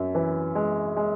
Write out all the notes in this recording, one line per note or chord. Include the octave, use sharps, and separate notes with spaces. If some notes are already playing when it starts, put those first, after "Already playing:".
Already playing: F#2
E3
G#3
G#3